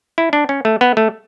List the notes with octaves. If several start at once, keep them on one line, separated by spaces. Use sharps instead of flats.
E4
D4
C#4
A3
B3
A3